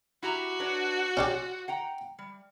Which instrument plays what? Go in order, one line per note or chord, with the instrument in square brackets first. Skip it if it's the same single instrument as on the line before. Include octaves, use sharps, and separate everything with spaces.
[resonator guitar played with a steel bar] E4 G4 A#5 [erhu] F#4
[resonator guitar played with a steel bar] D4 B4 C#5
[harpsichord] C#4 D4 G4 [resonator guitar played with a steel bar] F4
[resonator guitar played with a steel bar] F#5 G5 A#5
G3